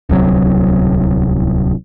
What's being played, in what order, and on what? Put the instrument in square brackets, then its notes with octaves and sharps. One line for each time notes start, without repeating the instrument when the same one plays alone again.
[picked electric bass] D1 C2 F#3